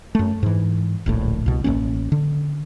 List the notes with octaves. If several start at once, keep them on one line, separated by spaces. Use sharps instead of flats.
F#2 A3
G#2 E3
D1 A#1 A2
C2 B2
A1 D#3 A#3 C#4
D3